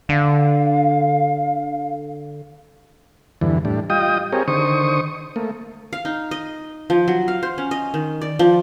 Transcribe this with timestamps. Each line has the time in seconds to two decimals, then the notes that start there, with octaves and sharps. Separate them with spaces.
0.09 D3 F5
3.41 E2 G2 D3 E3
3.65 A2 G3 D4
3.90 G3 F4 D#5 G5 D#6
4.33 C4 G4 G#4 A#4 C#5
4.48 D3 D#3 C5 C#6 D#6
5.36 A3 A#3
5.93 F5
6.05 D#4
6.31 D#5
6.90 F3
7.08 F#3
7.28 F5
7.43 C5
7.58 C#4
7.71 D#5
7.94 D#3
8.22 D5
8.39 F3